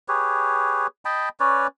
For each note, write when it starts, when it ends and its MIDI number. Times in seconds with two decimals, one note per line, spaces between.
0.08 0.87 67
0.08 0.87 68
0.08 0.87 71
0.08 0.87 73
1.05 1.29 75
1.05 1.29 79
1.05 1.29 81
1.05 1.29 83
1.40 1.67 61
1.40 1.67 71
1.40 1.67 73
1.40 1.67 74